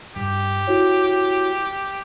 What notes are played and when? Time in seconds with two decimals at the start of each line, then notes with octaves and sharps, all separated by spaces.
0.16 G2 G4
0.67 E4 F#4 C#5